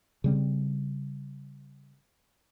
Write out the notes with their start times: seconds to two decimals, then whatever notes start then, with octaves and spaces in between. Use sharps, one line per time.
0.24 C#3 G3 C4